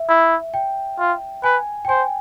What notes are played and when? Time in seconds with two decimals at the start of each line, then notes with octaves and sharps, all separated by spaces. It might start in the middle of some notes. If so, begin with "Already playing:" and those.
Already playing: E5
0.09 E4
0.54 G5
0.99 F4
1.44 B4 G#5
1.85 G5
1.89 C5 G#5